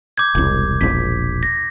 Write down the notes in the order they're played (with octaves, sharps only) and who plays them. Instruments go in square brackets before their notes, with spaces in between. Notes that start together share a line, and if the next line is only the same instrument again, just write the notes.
[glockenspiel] D6 G6 G#6
[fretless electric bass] E1 C2
[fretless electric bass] E1 A#1 [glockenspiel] B6
[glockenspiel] A#6